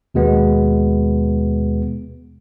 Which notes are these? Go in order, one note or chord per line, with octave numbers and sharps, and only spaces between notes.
D#2 B2 G#3 B3